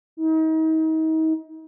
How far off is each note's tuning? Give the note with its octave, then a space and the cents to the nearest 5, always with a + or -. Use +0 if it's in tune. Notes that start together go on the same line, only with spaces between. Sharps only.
D#4 +35